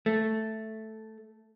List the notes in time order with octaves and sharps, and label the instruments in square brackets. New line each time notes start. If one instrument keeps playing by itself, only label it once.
[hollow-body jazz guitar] A3